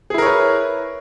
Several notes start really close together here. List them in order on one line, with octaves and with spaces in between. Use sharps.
G#4 E4 A#4 C#5 B4